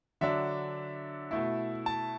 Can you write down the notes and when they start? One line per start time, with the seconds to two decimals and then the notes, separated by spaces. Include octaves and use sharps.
0.21 D3 F#3 D4 E5
1.31 B2 A3 E4
1.86 A5